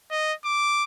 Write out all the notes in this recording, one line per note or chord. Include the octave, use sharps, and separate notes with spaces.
D#5
D6